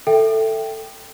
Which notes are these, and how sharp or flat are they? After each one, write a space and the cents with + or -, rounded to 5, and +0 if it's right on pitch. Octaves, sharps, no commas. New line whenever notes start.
A4 +10 E5 +0 G5 +0